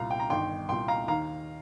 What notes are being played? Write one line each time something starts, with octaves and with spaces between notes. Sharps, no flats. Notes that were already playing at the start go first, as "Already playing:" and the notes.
Already playing: C2 A#2 F5 A#5
G5
A#5
G1 G2 D#3 G5 C6
C2 A#2 G5 C6
F5 A#5
D#2 D#3 F5 A#5